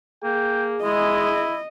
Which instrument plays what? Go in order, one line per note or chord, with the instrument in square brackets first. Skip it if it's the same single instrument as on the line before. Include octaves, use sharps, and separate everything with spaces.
[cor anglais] A#3 [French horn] G#4 [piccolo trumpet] G5
[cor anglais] G#3 [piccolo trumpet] E4 [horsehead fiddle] D#5